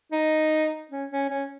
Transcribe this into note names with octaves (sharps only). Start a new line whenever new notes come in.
D#4
C#4
C#4
C#4